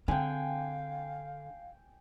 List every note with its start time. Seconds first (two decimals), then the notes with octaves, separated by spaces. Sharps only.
0.08 D3 C4 F5 G5 G#5